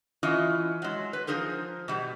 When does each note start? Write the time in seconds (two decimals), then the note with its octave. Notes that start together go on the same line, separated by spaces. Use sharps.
0.23 E3 C#4 E4 F4 D#5
0.82 F#3 G#3
1.13 B4
1.27 F3 D#4 G#4 A#4 C5
1.88 B2 G3